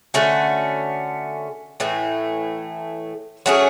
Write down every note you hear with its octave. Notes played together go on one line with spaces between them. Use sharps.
D3 A3 C#4 F#4
A2 E3 A3
F#3 A3 C#4 G#4